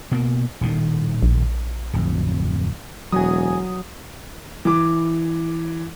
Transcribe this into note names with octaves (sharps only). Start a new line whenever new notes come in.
B2 A#3
D#1 A2 D#3
A#1
D1 F2
E1 F#3 G#5 D#6
E3 D6